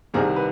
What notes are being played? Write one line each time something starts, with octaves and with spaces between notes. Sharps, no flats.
C2 C3 D#3 G#4 A#4
B4